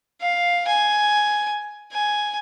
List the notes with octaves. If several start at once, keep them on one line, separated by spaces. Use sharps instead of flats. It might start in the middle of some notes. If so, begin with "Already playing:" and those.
F5
G#5
G#5